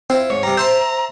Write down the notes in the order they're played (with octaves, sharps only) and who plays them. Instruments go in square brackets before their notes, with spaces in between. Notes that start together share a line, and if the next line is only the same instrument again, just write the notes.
[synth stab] C4 [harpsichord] E4 F4
[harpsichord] G#2 [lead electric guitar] C#5
[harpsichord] C3 G3 [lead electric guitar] A#5
[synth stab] C5 [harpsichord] E5 A5 C6